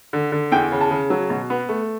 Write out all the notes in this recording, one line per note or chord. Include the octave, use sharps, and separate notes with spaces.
D3
D3
E2 G5
C#3
A5
C#3
F#3
B2
B3
A3